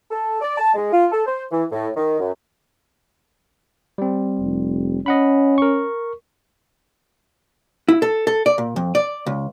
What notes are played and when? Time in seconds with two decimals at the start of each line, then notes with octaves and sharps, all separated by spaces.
0.11 A4
0.41 D5
0.58 A5
0.74 G#3
0.92 F4
1.11 A4
1.26 C5
1.51 E3
1.71 A2
1.97 D#3
2.19 F#2
3.98 G3 C4
4.40 F1
5.06 C#4 D#5 F#5 B5
5.58 A#4 C#6
7.88 E4
8.02 A4
8.27 A4
8.46 D5
8.58 A#2
8.76 F2
8.95 D5
9.26 C#2